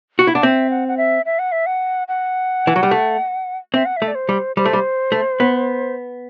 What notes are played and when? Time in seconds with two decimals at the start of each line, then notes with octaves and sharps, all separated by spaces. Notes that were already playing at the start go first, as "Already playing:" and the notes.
0.19 F#4
0.27 E4
0.34 D4 F#5
0.42 C4 E5
0.70 F#5
0.88 F#5
0.97 E5
1.26 E5
1.39 F#5
1.52 E5
1.66 F#5
2.08 F#5
2.67 E3
2.76 F#3
2.83 G3
2.91 A3
3.74 C4 E5
3.85 F#5
3.97 E5
4.02 A3
4.08 D5
4.15 C5
4.29 G3
4.57 G3 C5
4.65 A3
4.73 G3
5.12 A3
5.40 B3